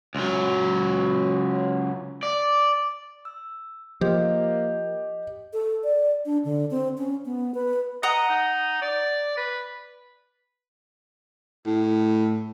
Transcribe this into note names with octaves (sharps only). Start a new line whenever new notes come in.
C#2 F#3
D5
E6
F3 A#3 G4 D#5
A4
D5
D4
D3
C4
C#4
B3
B4
D#5 F#5 A#5 D#6
D#4
D5
B4
A2